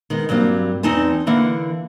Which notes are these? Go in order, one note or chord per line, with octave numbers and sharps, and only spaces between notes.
D#3 G#3 B3
G2 F#3 G3 A#3 C4
E2 C4 D#4 G#5 A5
D3 E3 A#3 F#5